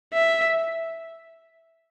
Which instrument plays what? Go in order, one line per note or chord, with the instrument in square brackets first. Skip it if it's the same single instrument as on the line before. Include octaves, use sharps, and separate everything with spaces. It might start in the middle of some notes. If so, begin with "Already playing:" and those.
[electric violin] E5